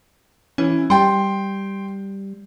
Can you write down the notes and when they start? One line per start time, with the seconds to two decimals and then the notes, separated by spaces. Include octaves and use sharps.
0.58 E3 C#4
0.90 G3 G5 C6